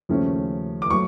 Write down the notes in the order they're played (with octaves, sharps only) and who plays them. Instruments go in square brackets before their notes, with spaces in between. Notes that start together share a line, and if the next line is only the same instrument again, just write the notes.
[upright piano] D#2 C#3 F3 A3 C#4
D6
F#3 A3 C#6